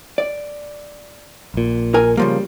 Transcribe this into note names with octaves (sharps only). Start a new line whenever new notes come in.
D5
A#1 A#2
A#4 G#5
C#3 F3 G3 A#3